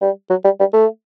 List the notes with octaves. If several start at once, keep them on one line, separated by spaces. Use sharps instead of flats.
G3
F#3
G3
G3
A3